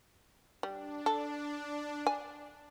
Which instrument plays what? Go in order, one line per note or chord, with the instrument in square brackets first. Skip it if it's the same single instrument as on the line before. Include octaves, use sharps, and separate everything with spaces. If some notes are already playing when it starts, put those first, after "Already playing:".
[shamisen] G3 [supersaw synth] D4
[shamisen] A4
G#5